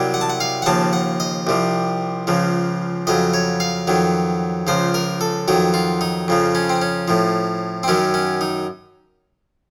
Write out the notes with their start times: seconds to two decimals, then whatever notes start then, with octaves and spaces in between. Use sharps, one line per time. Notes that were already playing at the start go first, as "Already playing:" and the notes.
Already playing: C2 C3 F#3
0.14 F#5
0.21 A5
0.30 F#5
0.40 F5
0.62 F#5
0.66 D#2 C#3 F3 A5
0.93 F#5
1.20 D#5
1.47 C2 C3 F3
2.27 C#2 C#3 F3
3.07 F2 C#3 F#3 D#5
3.34 C#5
3.60 F5
3.87 F2 D#3 F#3
4.67 C#2 C#3 F3 C5
4.94 A#4
5.21 A4
5.48 F2 D#3 F#3 F#4
5.74 F4
6.01 D#4
6.28 F2 C#3 F3
6.55 C#4
6.69 C4
6.82 C#4
7.08 A2 F3
7.83 C4
7.88 F#2 D#3 F#3 C#4
8.14 C#4
8.41 D#4